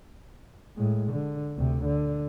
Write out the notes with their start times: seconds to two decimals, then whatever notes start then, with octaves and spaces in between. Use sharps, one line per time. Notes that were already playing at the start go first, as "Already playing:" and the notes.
0.77 A2 G#3
1.12 D3
1.56 D2 C3
1.85 D3